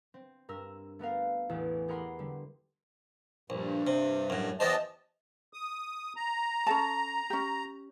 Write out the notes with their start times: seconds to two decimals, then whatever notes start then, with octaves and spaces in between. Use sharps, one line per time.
0.14 C4
0.49 G2 A#4 E6
0.99 A3 B3 A#4 F5
1.49 A1 E2 E4 G#4
1.88 G4 G#4 A#4 F#5 B5 C6
2.19 D3 G3
3.50 A#1 G2
3.87 C3
4.30 F#2 A2
4.60 E2 G4 C5 D#5 A5
5.53 D#6
6.16 A#5
6.66 C#4 A4 A5
7.30 C#4 G4